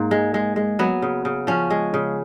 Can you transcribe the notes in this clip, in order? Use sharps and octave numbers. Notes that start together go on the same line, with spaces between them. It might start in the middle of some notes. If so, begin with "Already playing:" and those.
Already playing: G#2 A#3
G#3
G#3
G#3
F#3 B3
C#3
C#3
F3 C#4
G#3
C#3